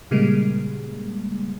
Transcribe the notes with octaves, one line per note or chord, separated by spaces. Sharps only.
A#2 C#3 G3 G#3 A#3